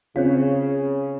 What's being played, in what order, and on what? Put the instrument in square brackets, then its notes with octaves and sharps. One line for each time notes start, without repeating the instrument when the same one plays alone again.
[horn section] C#3 [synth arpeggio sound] C4 C#4 F4